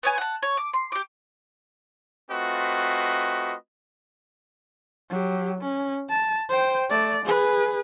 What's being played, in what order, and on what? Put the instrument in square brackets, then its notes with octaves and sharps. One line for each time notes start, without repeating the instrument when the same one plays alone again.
[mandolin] B3 C#5 G#5
F#5 A5
C#5
D6
C6
G4 D6
[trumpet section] A3 C4 F4 F#4 B4 D#5
[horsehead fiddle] F#3 G4
C#4
A5
C5 G5
A3 D5
G#4 B4